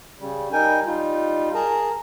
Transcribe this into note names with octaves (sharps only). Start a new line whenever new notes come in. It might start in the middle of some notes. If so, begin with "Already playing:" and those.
C#3 G3
G3 D#4 A#4 G5 G#5
G3 D#4 F4
G#4 A#4 A5 A#5